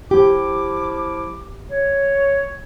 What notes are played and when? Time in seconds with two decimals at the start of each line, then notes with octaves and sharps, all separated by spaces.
0.11 F3 E4 G4 D6
1.70 C#5